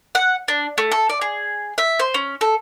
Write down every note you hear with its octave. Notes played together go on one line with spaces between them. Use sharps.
F#5
D4
A3
A4
D5
G#4
E5
C5
C#4
A4